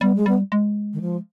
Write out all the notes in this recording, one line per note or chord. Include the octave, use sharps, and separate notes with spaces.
G3 B3
G#3
G3 B3
G#3
D#3
F3